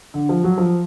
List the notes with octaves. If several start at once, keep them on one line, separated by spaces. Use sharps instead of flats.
D3
F3
F#3
F3